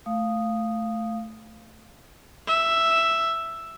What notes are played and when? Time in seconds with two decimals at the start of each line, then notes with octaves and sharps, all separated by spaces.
0.06 A3 F5 D#6
2.47 E5